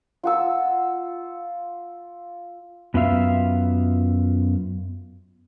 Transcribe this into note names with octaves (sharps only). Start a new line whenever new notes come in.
F4 F#5 E6
F#2 B3 F4 E5 F5